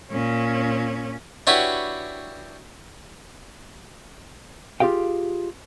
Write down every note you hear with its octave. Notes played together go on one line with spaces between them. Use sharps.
A#2 C#4
D4 E4 F#4 G4 B4 C#5
F4 G4 G#4 F5 G5